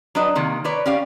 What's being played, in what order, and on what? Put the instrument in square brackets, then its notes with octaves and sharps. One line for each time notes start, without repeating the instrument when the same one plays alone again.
[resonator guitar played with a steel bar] F#3 D4 B4 D#5
C3 D#3 A#3
A#4 B4 C#5 D5
C#4 G4 D5 F5